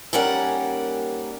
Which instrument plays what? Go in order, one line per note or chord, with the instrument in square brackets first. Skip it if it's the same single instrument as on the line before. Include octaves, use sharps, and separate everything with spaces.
[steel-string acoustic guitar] D#2 G3 C#4 A#4 F#5